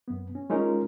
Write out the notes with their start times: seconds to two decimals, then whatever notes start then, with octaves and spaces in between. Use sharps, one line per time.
0.08 F#2 B3
0.35 C#4
0.50 G#3 C#4 D#4 F4 A#4